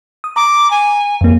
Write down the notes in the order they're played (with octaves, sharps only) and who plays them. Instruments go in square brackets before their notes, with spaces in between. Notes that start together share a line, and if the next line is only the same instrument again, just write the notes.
[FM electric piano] D#6
[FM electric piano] A#5 [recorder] D6
[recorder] G#5
[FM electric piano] F2 A#3